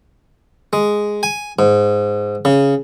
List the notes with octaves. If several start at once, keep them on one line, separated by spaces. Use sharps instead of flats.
G#3
G#5
G#2
C#3